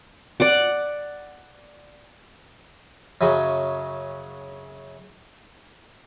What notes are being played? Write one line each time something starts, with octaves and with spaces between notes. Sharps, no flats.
D5 F#5 D6
F#2 C#3 F#3